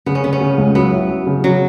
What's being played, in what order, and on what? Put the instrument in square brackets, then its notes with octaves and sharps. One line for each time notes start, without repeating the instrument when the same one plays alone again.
[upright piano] C#3 [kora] B3
[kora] C#4
[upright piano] C#3 [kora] B3
[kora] C#4
[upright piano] C#3
C#2
[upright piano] F#3 [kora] B3
[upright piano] E4
F#3
C#3
[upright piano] C#3 [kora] F#3